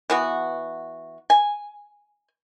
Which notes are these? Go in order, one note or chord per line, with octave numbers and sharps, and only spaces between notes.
E3 B3 F#4
G#5